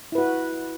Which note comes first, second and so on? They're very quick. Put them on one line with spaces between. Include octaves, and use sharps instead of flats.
E4 B4 F#4